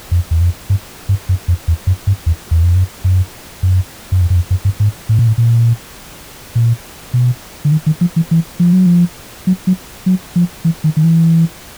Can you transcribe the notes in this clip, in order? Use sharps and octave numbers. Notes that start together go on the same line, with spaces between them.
F2
E2
F2
G2
G2
F#2
F2
E2
F#2
G2
E2
E2
F2
F#2
F#2
F#2
F#2
F2
F#2
F2
F#2
G2
G#2
A2
A#2
A2
A#2
A#2
B2
D3
D#3
D#3
F3
E3
E3
F3
F#3
F3
F#3
F#3
F#3
F3
E3
D#3
D#3
E3